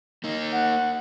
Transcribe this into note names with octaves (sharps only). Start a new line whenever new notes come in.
A#3 D#4
F#5